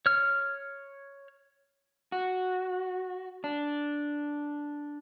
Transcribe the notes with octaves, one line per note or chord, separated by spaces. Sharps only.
C#5 F6
F#4
D4